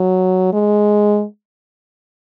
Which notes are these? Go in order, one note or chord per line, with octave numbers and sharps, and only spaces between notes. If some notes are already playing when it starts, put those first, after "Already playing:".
Already playing: F#3
G#3